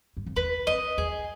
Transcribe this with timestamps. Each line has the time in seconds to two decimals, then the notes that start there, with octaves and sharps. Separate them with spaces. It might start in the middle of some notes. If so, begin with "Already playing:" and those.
0.17 F#2
0.26 F2
0.36 E2 B4
0.67 F2 D#5
0.97 E2 G#4